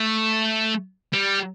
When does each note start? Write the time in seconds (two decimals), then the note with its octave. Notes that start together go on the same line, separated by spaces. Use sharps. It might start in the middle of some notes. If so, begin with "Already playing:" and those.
Already playing: A3
1.13 G3